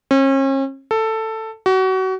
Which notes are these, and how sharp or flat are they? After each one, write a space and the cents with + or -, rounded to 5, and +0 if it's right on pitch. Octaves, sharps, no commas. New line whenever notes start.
C#4 -40
A4 +10
F#4 +30